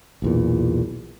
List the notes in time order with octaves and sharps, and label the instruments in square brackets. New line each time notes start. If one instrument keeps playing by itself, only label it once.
[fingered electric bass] B1 E2 A#2